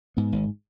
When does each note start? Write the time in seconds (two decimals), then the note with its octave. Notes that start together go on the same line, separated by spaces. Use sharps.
0.17 G#2 B3
0.32 G#1